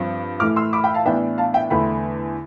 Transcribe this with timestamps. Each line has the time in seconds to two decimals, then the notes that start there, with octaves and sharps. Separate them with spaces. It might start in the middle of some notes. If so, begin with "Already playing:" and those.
Already playing: G2 F3 C4
0.40 A2 E3 A3 D6 F6
0.56 C6 E6
0.73 B5 D6
0.84 G5 B5
0.94 F5 A5
1.05 A2 E3 B3 D4 E5 G5
1.38 F5 A5
1.54 E5 G5
1.70 E2 D3 A3 G5 B5